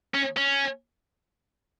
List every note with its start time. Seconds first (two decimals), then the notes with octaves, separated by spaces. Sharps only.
0.14 C#4
0.37 C#4